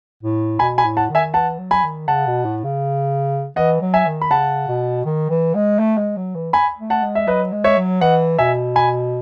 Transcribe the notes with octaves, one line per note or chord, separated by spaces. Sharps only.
A2
B2 G#5 B5
G#5 B5
A2
F#5 A5
D#3
E5 G#5
E3 F#5 A5
F#3
G#5 B5
D#3
C#3 F#5 A5
B2
A2
C#3
E3 D#5 F#5
F#3
E5 G#5
D#3
B5
C#3 F#5 A5
B2
D#3
E3
G#3
A3
G#3
F#3
E3
G#5 B5
A3
F#5 A5
G#3
E5
F#3 B4 D#5
G#3
C#5 E5
F#3
E3 D#5 F#5
B2 E5 G#5
G#5 B5